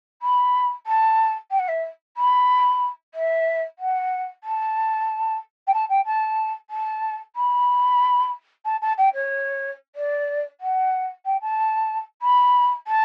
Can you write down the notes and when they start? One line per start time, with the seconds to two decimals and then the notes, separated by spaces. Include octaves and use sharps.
0.22 B5
0.86 A5
1.51 G5
1.59 F#5
1.68 E5
2.17 B5
3.14 E5
3.78 F#5
4.43 A5
5.67 G5
5.73 A5
5.89 G5
6.05 A5
6.70 A5
7.35 B5
8.65 A5
8.81 A5
8.97 G5
9.14 C#5
9.95 D5
10.60 F#5
11.25 G5
11.41 A5
12.21 B5
12.87 A5